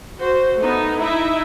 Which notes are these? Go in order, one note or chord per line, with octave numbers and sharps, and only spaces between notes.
F#4 C5
A3 B3 D#4
D#4 E4 E5